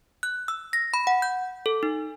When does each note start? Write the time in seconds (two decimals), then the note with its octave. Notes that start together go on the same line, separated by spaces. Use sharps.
0.23 F#6
0.48 E6
0.73 A#6
0.94 B5
1.07 F#5
1.22 G6
1.66 A4
1.83 D#4